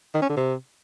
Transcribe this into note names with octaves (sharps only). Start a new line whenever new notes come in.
D#3
C#4
D3
C3